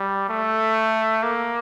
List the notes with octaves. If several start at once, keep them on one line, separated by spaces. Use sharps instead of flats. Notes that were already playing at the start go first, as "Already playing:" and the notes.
Already playing: G3
A3
A#3